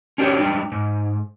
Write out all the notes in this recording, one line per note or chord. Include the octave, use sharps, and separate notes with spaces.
C#4 D4 G4 C5 C#5
G3 G#3 D4
G#2